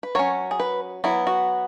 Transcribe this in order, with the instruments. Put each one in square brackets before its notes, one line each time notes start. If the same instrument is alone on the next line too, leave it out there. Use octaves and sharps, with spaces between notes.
[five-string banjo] B4
F#3 C#4 C#5
G#4
B4
F#3 B3 E4
F#4